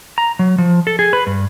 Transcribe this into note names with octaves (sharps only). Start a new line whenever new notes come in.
A#5
F#3
F3
A4
G#4
B4
G2